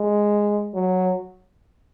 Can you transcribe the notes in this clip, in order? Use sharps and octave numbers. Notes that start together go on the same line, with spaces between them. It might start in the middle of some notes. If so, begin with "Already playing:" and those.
Already playing: G#3
F#3